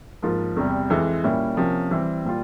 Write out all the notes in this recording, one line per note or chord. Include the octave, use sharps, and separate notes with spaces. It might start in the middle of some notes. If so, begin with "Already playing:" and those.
G#2 F3 A#3 F4
E2 C3 G3
F2 E3 G#3
A#2 G3 A#3 C#4 E4
C3 F3 A#3 C#4
E3 G3 C4
A#2 G3 A#3 F4